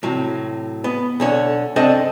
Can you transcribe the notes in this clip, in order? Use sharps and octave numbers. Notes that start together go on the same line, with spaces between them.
A2 C3 F#3
B3
B1 D3 C#5
C2 F#2 C4 D4 A4 D#5